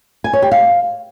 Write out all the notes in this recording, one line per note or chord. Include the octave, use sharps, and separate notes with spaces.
G#5
C#5
G4
F5